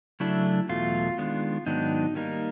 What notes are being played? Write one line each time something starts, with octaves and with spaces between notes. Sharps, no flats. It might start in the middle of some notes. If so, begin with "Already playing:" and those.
C#3 F#3 A3 D4 E4
E2 B2 F#3 A3 F4
D#3 G#3 B3 D4
G#2 D#3 F#3 B3 D4 D#4
D#3 G3 A#3 D#4